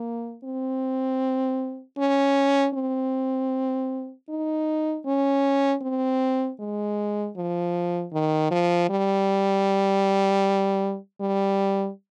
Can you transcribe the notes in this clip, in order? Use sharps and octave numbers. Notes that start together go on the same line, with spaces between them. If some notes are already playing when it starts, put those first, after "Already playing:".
Already playing: A#3
C4
C#4
C4
D#4
C#4
C4
G#3
F3
D#3
F3
G3
G3